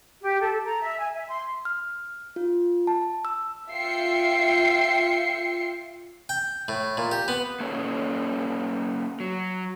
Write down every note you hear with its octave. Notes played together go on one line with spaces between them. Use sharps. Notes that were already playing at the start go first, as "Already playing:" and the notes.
G4
A4
A#5
E5
G#5
E5
C6
F6
F4
A5
E6
F4 E5 G5 C7 C#7
G5
A2
A#2
G4
B3
A#3 C#4 A4 B4 C#5
F#3